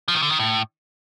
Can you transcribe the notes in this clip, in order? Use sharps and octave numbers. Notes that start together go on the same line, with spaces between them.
F3
D#3
D3
D#3
A2